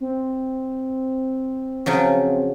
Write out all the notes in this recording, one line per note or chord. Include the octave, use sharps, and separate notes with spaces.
C4
C#3 F3 F#3